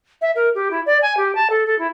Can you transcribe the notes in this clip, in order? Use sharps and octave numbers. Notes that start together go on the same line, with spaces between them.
E5
A#4
G4
E4
D5
G#5
G4
A5
A4
A4
E4